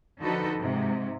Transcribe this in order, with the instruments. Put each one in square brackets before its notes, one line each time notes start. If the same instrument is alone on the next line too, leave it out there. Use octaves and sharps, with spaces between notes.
[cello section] D3 F3 D#4 F#4 A4 B4
G#2 C3